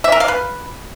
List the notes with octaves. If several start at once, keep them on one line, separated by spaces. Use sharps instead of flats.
E5
A#4
F5
B4